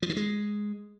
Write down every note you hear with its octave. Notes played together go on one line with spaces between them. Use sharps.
F3
D#3
G#3